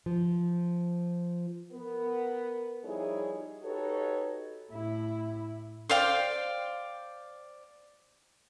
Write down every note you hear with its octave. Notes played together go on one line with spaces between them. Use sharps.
F3
B3 A#4
F3 G3 D#4 E4 G#4 C#5
D#4 F#4 G4 A4 B4 C#5
A2 E4
C5 D5 F5 G5